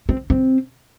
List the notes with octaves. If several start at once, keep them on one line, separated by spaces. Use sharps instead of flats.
C4
C4